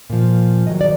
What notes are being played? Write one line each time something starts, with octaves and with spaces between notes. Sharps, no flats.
A#2 F3
G#2 D#3 F#3 D#5
D5